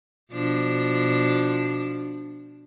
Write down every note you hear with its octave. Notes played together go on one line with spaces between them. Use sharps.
B2 F3 D4